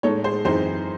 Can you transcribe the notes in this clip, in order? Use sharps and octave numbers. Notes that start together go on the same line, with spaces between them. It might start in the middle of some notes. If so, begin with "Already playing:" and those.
A2 G#3 D#4 A4 C#5
G#4 C5
F#2 E3 C4 D#4 G#4 C5